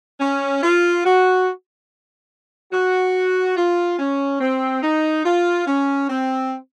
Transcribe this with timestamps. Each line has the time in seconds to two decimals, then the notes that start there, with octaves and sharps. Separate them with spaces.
0.20 C#4
0.63 F4
1.05 F#4
2.73 F#4
3.57 F4
3.99 C#4
4.41 C4
4.83 D#4
5.25 F4
5.67 C#4
6.09 C4